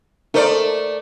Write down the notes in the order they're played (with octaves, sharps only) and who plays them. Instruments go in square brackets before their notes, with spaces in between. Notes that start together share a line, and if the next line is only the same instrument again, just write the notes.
[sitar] A3 D5 [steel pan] D#4 A#4 C5